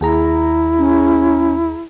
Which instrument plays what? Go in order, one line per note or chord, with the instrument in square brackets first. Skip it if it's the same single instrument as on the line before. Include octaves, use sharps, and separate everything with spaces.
[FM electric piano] D#2 G#4 A#5 [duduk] E4
[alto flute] C#4